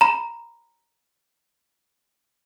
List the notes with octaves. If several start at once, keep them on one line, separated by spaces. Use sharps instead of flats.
A#5 B5